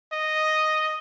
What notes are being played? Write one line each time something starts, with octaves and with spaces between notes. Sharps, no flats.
D#5